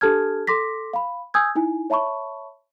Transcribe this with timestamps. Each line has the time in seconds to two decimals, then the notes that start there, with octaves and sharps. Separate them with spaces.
0.01 D4 G4 A4 A5 F6 G#6
0.47 A4 C6 D6 A#6 B6
0.93 F5 B5
1.34 G#5 D#6 E6 G6 G#6
1.55 D#4 E4 G#5
1.90 C#5 E5 A5 B5 C#6